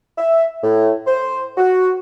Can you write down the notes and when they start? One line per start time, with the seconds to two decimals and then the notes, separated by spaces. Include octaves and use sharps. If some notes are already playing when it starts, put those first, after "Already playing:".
0.18 E5
0.62 A2
1.06 C5
1.58 F#4